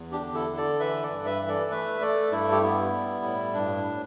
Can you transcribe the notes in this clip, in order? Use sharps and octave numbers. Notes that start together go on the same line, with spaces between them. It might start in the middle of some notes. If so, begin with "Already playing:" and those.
Already playing: E2
D4 G4
D3
E4 A4
D3
A4 D5
E3 B4 E5
A4 D5
G2
B4 E5
E3
A4 D5
A3 B4 E5
A3 A4 D5
G2 E4 A4
G4
B3 E4
G3
A2
G2 D4